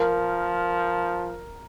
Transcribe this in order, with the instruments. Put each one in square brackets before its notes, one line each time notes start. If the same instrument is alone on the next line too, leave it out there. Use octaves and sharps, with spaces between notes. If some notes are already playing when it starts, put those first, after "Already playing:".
Already playing: [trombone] F3 [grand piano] A#4